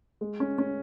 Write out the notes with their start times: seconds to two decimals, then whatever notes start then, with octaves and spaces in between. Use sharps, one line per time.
0.21 G#3
0.40 C#4
0.58 C#4